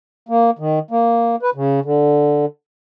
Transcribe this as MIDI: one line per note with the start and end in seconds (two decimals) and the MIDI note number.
0.29 0.51 58
0.59 0.79 51
0.91 1.36 58
1.42 1.50 71
1.55 1.80 49
1.85 2.45 50